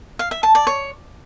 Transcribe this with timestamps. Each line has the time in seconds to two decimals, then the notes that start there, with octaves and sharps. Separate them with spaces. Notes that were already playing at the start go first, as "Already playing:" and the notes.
0.19 F5
0.31 E5
0.43 A5
0.55 D5
0.67 C#5